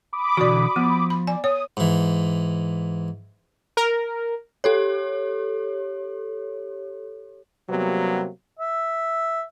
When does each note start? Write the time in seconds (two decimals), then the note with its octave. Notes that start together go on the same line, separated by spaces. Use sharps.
0.13 B5 D6 D#6
0.37 B2 D3 E3 F#4 D5
0.76 F3 B3
1.10 B5
1.27 D5 G#5
1.44 C#5 D#6
1.77 G#2 E3
3.77 A#4
4.64 G4 A4 C#5
7.69 C3 F#3 G3 A#3 B3
8.59 E5